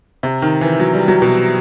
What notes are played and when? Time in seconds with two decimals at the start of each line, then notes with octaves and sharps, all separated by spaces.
0.23 C3
0.42 D#3
0.61 E3
0.80 F#3
0.94 G3
1.08 F#3
1.22 B2